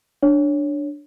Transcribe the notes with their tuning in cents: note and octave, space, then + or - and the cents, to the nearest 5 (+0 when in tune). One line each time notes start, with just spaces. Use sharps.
D4 +0 C#5 +0